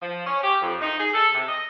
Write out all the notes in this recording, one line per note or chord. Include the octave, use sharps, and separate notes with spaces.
F3
C#4
G4
F2
D#4
G#4
A4
C3
D#5